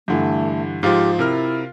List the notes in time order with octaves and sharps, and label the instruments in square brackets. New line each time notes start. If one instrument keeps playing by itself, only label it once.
[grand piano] G2 D3 E3 [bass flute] A3
[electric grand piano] G#2 F3 [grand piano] F4 F5 [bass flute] G4
[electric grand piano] C3 A#4 F6 [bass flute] E4